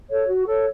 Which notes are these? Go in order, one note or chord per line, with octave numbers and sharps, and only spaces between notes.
A4 C#5
F#4
A4 C#5